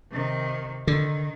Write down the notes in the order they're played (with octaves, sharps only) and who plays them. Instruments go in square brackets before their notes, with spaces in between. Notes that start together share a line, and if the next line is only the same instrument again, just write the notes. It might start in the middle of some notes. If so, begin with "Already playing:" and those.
[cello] C3 D#3
[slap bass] D3 [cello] D#3